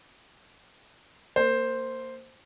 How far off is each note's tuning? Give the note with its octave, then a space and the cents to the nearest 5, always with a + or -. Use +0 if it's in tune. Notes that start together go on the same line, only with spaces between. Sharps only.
A#3 -20 C5 +0